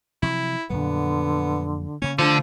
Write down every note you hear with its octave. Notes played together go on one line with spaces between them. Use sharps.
C3 F3 F#3 E4
F2 A#2 D3 F#3 B3
C#3 A#3 C#4
D3 F3 A3 D4